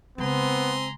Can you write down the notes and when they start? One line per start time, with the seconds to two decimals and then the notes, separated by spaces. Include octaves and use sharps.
0.18 C#3 G#3 B3 C4 G#5 A#5 C6